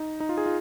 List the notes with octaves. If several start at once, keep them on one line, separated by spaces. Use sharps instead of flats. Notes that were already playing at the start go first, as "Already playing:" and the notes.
Already playing: D#4
D#4
F4
G#4
F4